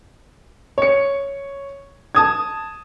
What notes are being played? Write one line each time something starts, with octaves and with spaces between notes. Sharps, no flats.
C#5 C#7
A5 D#6 G#6